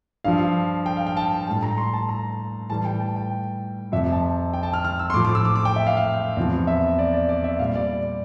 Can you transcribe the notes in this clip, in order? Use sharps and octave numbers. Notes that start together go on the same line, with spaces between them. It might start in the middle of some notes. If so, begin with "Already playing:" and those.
G2 F3 F5
G5
F5
G5
A5
A2 G3 A5
A#5
C6
A5
A#5
A2 E3 G3 A5
G5
A5
G5
F2 C3 F3 E5
A5
G5
A5
F6
F6
E6
C6
A2 F3 D6
D6
E6
D6
D6
G5
E5
F5
F5
E2 C3 F3
E5
D5
D5
D5
E5
A#2 G3 F5
D5